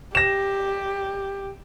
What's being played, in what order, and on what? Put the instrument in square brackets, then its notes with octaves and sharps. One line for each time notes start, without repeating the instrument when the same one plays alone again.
[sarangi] G4 [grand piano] A#6 E7